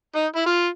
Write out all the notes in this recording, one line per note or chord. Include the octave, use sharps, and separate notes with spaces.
D#4
E4
F4